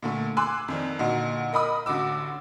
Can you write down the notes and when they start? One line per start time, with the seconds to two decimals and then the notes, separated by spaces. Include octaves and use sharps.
0.02 A#2 D3 A3
0.37 G#5 C6 D6 E6 F#6
0.68 F2 D#3 D4
0.99 A#2 D3 D#4 F#4
1.52 A#4 D#5 B5 D#6
1.86 A1 D3 F#4 D6 E6